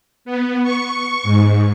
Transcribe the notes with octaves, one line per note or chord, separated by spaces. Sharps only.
B3
C#6
G#2